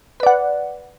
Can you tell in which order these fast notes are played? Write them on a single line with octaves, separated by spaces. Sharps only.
B4 D5 F#5